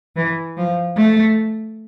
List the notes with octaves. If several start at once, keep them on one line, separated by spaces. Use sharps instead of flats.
E3
F3
A3